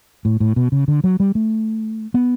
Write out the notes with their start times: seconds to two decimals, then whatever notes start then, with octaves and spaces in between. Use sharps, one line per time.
0.25 A2
0.40 A2
0.56 B2
0.72 C#3
0.88 D3
1.04 F#3
1.20 G3
1.35 A3
2.14 B3